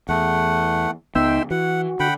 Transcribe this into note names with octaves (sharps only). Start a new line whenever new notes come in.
E2 A3 F#5
C#2 B3 D#4 E5 G5 C6 E6
E3 F#4 F#5
D3 F#5 G5 B5